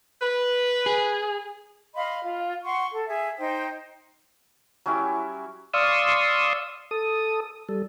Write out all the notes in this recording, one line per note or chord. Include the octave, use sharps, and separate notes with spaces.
B4
G#4
D#5 F5 B5 C6
F4
F#5 C6 C#6
A4
G#4 E5
D#4 C5 G5
F#3 G3 C#4 E4
D5 F5 C6 C#6 D#6 E6
A4 D#6
G3 A4